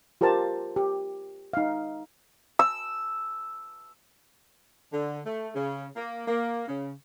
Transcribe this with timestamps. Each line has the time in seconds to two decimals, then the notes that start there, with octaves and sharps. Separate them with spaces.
0.21 F4 G4 A#4 C5 A5
0.76 G4
1.53 D#4 F5
2.59 E6
4.92 D3
5.26 A3
5.55 C#3
5.96 A#3
6.27 A#3
6.68 C#3